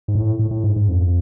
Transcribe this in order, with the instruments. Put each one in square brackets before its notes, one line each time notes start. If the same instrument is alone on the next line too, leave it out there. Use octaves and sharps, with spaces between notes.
[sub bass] G#2
A2
A2
A2
G#2
G#2
F2